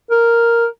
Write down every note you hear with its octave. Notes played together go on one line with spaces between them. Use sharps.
A#4